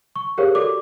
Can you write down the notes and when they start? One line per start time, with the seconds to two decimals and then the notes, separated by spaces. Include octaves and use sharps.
0.16 C#6
0.38 G4 G#4 A#4 C5 C#5 F5
0.55 F#4 A4 D5 D6